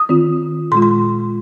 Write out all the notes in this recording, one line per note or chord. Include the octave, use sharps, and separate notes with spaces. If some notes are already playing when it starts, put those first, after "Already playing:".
Already playing: D#6
D#3 C4 F4
A#2 G#3 F4 C6
C6